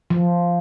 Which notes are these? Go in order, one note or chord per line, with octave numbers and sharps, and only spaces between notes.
F3